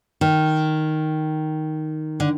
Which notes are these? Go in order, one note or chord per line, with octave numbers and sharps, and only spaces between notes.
D#3
D3